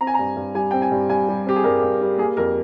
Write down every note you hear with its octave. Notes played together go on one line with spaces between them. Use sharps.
C4 A#5
G#5
G2 A#5
G2
G3 G#5
C4 G5
G#5
G2
G2 G#5
G3
C4 G4
G#4
G2 A#4
G2
G3
A#3 G#4
F2 A#4